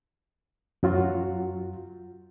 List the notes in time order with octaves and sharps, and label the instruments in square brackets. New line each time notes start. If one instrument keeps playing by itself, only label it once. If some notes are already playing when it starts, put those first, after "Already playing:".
[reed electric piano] F#2 F#3 F4 F#4